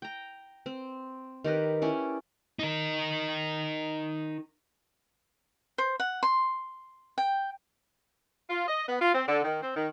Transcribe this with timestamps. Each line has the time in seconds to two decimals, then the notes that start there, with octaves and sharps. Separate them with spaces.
0.02 G5 A#5
0.66 C4
1.44 D#3 G4 A#4 B4
1.82 C#4 E4 D5
2.59 D#4 A#4
5.78 C5
6.00 F#5
6.23 C6
7.18 G5
8.49 F4
8.68 D#5
8.89 B3
9.01 F4
9.14 C4
9.28 D3
9.43 D#3
9.62 C4
9.76 D#3